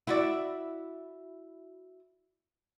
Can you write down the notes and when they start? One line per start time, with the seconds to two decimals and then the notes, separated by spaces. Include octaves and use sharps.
0.07 E4 F#4 D5